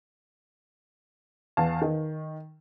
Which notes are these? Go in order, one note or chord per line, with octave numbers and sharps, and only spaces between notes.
E2 F5 A5
D#3